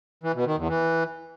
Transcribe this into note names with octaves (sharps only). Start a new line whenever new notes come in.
E3
B2
D#3
E2
E3